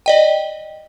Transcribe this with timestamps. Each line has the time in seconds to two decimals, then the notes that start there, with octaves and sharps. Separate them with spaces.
0.06 D5 D#5 G5